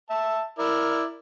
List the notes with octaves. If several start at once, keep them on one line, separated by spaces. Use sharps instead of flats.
E5 A5
E4 A#4 D5